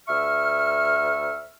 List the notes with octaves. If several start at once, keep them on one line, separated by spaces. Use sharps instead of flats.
D2 E5 C#6 F6